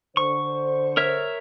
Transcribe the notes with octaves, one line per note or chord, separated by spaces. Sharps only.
D3 C5 C#6
A#4 C#5 E5